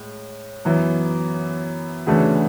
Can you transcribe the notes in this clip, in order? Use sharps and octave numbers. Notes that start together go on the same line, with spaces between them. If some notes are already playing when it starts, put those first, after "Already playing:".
Already playing: A2 G#3
F#2 E3 B3 E4
D2 C#3 E3 A3 D4